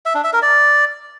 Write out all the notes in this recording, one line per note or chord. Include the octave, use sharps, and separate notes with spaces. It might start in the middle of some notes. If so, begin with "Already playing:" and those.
E5
D4
E5
A#4
D5